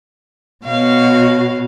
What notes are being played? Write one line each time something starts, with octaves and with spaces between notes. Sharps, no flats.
B2 F#4 C#5 F5